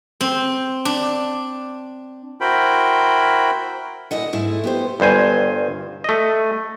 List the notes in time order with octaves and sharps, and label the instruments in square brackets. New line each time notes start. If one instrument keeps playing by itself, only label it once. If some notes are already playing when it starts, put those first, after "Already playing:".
[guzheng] C4
D4
[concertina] E4 F#4 A#4 C5 G5 B5
[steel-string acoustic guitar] D2 A#2 E4 D#5 F#5
G#2 A3 E4
B3 G4 C5
[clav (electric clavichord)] G1 G2 C5 G#5
A3 D#5